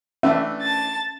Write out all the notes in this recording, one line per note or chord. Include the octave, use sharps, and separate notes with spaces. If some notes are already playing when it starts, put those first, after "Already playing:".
E3 A3 C#4 D4 E5
A5 A6